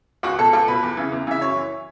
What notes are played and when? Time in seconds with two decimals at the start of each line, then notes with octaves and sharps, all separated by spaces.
0.23 C#2 F#4
0.39 B2 A4
0.53 C#2 A4
0.68 B2 B4
0.83 E2
0.97 C#3 E3
1.12 E2
1.27 C#3 E3 E5
1.41 F#2 C#5
1.56 E3